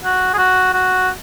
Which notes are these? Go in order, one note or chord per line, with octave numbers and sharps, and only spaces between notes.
F#4
G#4
F#4
F#4